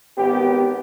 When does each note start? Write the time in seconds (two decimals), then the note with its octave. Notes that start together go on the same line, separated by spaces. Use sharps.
0.18 G#1 B3 G4